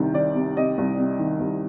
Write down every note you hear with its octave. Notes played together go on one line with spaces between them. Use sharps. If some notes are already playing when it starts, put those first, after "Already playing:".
Already playing: C2 C3 D#3
D#3 D5
C3
C3 D#5
C2
C3
D#3
C2